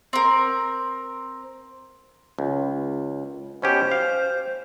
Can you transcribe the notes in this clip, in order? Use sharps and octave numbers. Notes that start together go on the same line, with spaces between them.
C4 A#4
C#2
B2 C#4 G4 C5
F5